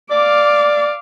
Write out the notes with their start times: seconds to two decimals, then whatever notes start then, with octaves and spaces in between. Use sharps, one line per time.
0.11 D5 F5 D6